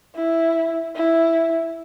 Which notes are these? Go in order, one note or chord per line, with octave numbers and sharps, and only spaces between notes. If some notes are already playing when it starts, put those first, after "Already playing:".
E4
E4